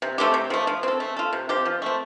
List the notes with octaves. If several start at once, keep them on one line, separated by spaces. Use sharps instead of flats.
C3
A3 C4 G4
C3
F3 A3
F3
C4 A4
A3
F4 A4
C3
F3 C4 G4
F3
A3 C4